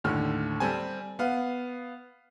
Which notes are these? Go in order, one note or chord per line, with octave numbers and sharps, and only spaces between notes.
D#2 A2 D3 F6
G3 C4 A4 G#5
B3 F5